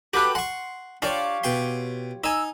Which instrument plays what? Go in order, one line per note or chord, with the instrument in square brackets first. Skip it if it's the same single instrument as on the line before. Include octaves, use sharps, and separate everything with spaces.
[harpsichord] F#4 A4 [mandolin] G4 B4 F#6
[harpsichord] F#5 C#6 [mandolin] C6
[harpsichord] D4 D5 [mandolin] F4 G4 C#5
[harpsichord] B2 G5 C6
[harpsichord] D#4 G#5 [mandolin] E6